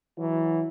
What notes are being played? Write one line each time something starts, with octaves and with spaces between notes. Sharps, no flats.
E3 F#3